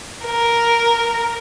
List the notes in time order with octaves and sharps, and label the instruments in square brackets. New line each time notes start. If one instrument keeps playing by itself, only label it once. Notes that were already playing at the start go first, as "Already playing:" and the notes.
[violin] A#4